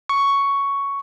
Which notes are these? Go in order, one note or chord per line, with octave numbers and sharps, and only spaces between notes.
C#6